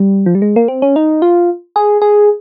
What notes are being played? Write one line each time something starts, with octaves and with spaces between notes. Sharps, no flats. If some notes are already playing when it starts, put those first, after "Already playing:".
Already playing: G3
F3
G3
G#3
A#3
C4
C#4
D#4
F4
G#4
G#4